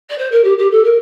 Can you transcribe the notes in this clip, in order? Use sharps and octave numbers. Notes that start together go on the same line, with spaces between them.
D5
C5
A#4
G4
G4
A4
A#4